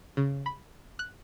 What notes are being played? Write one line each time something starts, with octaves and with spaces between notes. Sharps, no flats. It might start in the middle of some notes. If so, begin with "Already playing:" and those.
C#3
B5
F#6